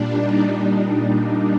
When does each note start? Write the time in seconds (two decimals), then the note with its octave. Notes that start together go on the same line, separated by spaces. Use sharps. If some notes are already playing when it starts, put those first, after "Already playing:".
Already playing: A#2 G3 D4
0.15 D#4